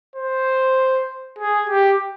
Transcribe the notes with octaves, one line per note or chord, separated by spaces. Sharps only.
C5
G#4
G4